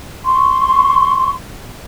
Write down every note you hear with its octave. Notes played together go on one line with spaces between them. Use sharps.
C6 C#6